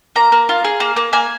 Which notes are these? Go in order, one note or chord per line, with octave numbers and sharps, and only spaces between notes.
A#3 A#5
A#3
F4
G#4
A#3
A#3
A#3 G#5